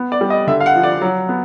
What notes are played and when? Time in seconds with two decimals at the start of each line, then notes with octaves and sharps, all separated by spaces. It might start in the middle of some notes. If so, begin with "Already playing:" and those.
Already playing: B3
0.12 D5
0.21 G3
0.30 D#5
0.47 D3 E5
0.60 F5
0.66 F#5
0.76 F3
0.83 D5
1.02 F#3
1.29 B3